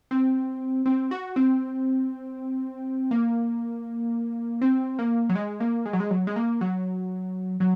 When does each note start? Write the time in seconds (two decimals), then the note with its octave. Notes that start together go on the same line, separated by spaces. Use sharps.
0.11 C4
0.86 C4
1.11 F#4
1.36 C4
3.11 A#3
4.61 C4
4.99 A#3
5.29 F#3
5.35 G#3
5.60 A#3
5.86 G#3
5.93 F#3
6.00 G#3
6.11 F#3
6.27 G#3
6.36 A#3
6.61 F#3
7.60 F#3